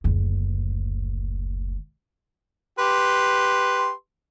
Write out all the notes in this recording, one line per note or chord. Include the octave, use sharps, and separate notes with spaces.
F#1 D2
G4 B4 C6